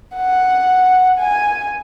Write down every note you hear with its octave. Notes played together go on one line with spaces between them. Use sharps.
F#5
G#5